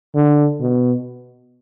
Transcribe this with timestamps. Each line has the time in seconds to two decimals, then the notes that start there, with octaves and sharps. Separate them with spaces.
0.15 D3
0.60 B2